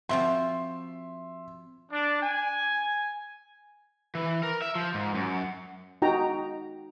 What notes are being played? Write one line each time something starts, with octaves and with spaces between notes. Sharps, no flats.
F3 C4 F#4 E5 C6
D4
G#5
E3
A#4
E5
F3
G#2
F#2
D#4 F#4 G5 A#5